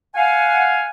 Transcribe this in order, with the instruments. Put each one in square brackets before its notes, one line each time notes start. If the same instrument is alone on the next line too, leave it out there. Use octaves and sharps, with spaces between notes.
[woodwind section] F5 F#5 G#5